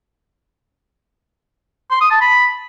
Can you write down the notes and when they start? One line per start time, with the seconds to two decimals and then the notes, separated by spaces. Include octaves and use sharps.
1.91 C6
2.01 D#6
2.11 A5
2.21 B5